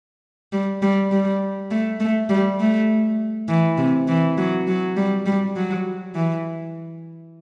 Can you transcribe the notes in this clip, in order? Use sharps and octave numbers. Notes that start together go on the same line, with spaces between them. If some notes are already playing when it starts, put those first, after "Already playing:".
G3
G3
G3
A3
A3
G3
A3
E3
C3
E3
F#3
F#3
G3
G3
F#3
E3